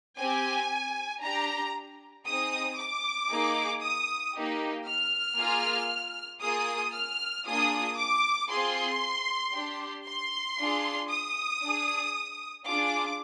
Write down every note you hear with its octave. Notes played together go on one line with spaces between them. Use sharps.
C4 G4 G#5
D4 G4 A#5
C4 D#4 G#4 D#6
D6
A#3 D#4 G#4
D#6
A#3 D#4 G4
F6
A#3 F4 G#4
A#3 F4 G#4 D#6
F6
A#3 D4 F4 G#4 D#6
D6
C4 F4 G#4 C6
D4 G4
C6
D4 F4 G#4
D#6
D4 G#4
D4 F4 G#4 D6